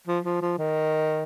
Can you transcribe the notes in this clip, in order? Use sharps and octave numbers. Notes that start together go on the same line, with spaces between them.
F3
F3
F3
D#3